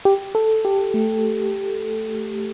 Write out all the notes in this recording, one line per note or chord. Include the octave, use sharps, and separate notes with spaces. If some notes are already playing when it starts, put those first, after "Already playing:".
G4
A4
G4
A3